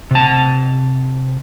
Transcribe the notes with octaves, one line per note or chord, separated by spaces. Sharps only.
C3 A5